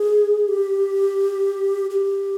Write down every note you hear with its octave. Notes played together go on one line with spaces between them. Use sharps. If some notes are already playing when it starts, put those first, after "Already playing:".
Already playing: G#4
G4
G4